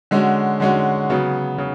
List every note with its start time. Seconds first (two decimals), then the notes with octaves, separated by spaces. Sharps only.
0.11 D3 G#3 C#4 F#4
0.60 D3 G#3 C#4 F#4
1.10 C#3 F#3 B3
1.58 C#3